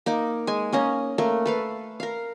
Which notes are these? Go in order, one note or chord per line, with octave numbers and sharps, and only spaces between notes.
A#3 D#4 D6
G#3 G#5
A#3 C#4 D#5
A3 A#3 A#4
A4 B4 F5
A#4 F5